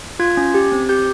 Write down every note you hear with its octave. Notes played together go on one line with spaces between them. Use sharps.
F4 G#6
C#4
G4
C4
G4 G6